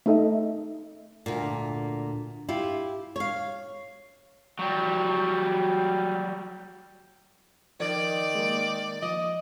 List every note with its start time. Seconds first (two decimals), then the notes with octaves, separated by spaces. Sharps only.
0.06 A3 D#4 A4 D#5 E5
1.26 D2 A#2
2.49 E4 F4 G4
3.16 C#5 F5
4.59 F#3 G3
7.80 D#3 F3 D5
8.35 G#3 A#3
9.03 F3 D#5